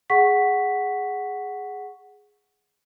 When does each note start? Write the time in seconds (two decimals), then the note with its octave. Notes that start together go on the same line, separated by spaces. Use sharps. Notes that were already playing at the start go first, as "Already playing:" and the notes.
0.10 G#4 F#5 C#6 B6